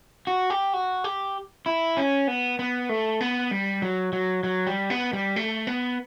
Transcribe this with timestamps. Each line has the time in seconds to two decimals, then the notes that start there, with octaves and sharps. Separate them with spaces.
0.27 F#4
0.50 G4
0.74 F#4
1.04 G4
1.66 E4
1.97 C#4
2.28 B3
2.59 B3
2.89 A3
3.21 B3
3.51 G3
3.82 F#3
4.13 F#3
4.43 F#3
4.67 G3
4.90 B3
5.13 G3
5.36 A3
5.67 B3